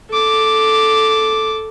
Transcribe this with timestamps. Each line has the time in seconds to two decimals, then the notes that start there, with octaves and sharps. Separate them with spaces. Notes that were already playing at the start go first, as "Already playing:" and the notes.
0.11 A4 D6